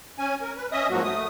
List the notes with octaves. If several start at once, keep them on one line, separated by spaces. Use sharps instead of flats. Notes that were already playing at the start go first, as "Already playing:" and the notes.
C#4 G#5
A#4
B4
C#4 D#5 E5 D#6
G#2 F3 F#3 A#3 F#4
A3 D#6